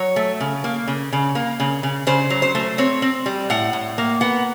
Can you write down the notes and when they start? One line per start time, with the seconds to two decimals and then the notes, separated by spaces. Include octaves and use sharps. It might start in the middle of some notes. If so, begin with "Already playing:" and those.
Already playing: F#3 C#5
0.16 A3
0.40 C#3
0.64 A#3
0.88 C#3
1.13 C#3
1.35 A#3
1.60 C#3
1.83 C#3
2.07 C#3 C5
2.30 F#3
2.42 C5
2.55 A3
2.78 C4 C#5
3.02 C4
3.26 G3
3.50 A2 F#5
3.73 A2
3.98 A#3
4.21 B3 F#5